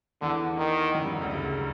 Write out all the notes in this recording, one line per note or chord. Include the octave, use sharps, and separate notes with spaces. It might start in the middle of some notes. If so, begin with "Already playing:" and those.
E2 D3 E3
D#3
F#2 F#3
G2 G3
F#2 F#3
D2 D3
C#2 C#3